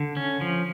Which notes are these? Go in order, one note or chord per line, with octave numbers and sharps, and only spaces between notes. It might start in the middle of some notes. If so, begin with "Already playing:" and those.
Already playing: D3
C#4
F3